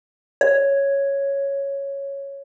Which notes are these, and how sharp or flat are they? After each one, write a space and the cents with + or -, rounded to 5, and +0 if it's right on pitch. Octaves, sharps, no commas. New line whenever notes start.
C#5 +0